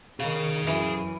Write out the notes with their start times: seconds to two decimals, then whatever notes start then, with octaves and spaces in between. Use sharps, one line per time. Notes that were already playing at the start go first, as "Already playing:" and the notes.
0.20 D#3 G#4 F5
0.67 F#2 E3